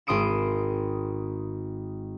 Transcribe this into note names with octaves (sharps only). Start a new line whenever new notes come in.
G#1 C6 D#6 D7 E7